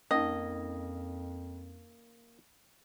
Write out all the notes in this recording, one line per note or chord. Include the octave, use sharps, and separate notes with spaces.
F2 A#3 C#4 D#4 D#5